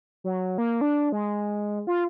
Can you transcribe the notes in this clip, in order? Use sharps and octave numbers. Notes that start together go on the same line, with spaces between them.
F#3
A#3
D4
G#3
F4